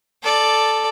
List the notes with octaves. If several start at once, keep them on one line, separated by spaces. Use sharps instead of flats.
A4 D5